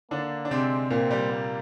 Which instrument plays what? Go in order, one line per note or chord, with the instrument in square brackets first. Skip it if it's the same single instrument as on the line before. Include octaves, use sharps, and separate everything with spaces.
[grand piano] D3 D4 [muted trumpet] A#3
[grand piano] D4
[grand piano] C3 C4 [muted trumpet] G#3
[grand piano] A#2 A#3 [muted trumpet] C4
[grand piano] G3
[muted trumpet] A#3